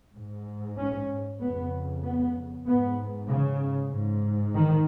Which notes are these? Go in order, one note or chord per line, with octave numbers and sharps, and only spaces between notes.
G#2
C#4
F2 C#3 B3
B3
G#2 B3
C#3
G#2
D#3